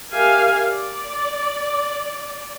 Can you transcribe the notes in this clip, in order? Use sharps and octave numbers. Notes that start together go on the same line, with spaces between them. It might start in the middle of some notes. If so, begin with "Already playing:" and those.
G4 A#4 E5 F5 G#5
D5